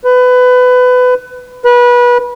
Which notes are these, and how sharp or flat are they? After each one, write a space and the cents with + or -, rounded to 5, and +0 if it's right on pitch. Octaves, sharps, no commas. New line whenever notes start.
B4 +20
B4 -25